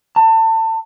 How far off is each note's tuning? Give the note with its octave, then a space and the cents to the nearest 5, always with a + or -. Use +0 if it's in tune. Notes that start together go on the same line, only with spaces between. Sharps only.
A5 +30